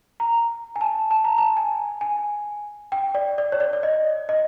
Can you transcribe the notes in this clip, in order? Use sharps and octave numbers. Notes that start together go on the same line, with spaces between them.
A#5
G#5
A5
A5
A#5
A5
G#5
G#5
G5
D5
D5
C#5
D5
D5
D#5
D#5